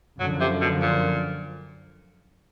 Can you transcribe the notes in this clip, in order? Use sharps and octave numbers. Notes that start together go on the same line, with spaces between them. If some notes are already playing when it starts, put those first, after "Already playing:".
F#2 D3 F3 F#3
C3
B2
A#2